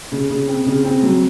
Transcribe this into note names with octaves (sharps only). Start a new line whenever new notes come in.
C#3
C#3
C4
C#3
C4
F#3